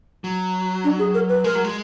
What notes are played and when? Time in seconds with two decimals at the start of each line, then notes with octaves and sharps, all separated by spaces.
0.24 F#3
0.84 D4
0.99 G#4
1.14 A#4
1.29 B4
1.44 G#3 A#4
1.55 F#3
1.64 G#3